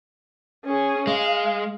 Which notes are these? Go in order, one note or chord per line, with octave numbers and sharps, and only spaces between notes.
C#4 G#4
G#3 F5